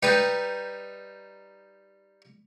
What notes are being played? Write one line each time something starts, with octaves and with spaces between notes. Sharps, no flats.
G3 D#4 G4 B4